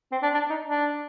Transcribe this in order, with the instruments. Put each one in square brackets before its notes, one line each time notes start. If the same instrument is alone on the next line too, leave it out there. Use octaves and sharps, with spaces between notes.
[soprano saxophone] C4
D4
D4
D#4
D4